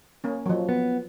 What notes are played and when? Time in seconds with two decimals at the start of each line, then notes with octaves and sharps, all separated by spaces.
0.24 A#3 C#4
0.46 F3 F#3
0.69 B3